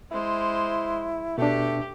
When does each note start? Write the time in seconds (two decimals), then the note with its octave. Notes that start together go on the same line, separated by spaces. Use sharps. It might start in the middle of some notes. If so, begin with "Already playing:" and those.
0.11 G#3 E4 C5
1.38 B2 A3 D4 G4